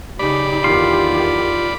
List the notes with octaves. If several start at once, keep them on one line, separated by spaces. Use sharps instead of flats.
C#3 D#4 G4 D5 B5
E2 D#3 F4 C6